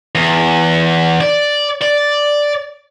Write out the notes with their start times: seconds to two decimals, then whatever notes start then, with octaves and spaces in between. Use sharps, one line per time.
0.15 E2
1.21 D5
1.82 D5